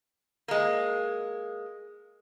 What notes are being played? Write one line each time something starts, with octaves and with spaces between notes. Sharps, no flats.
G#3 A#3